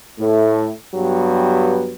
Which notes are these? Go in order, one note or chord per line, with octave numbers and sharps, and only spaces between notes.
A2 A3
G2 F#3 B3 G4